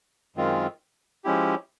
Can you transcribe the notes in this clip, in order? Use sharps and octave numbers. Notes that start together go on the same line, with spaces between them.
F#2 D#3 G#3 C4 F4
F3 G#3 C#4 E4 G4